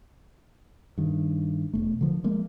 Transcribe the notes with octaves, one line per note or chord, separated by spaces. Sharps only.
G2 D#3
E1 A3
D3 F3
F3 G#3 A#3